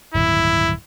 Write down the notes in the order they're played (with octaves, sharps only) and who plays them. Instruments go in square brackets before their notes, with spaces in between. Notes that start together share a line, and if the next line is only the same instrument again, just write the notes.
[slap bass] D1 G2 D#3 [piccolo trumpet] E4